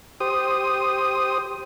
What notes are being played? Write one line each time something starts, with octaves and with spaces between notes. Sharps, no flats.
G4 C5 D#6